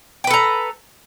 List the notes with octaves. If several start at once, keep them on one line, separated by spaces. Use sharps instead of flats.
A4 B4 G5 A#5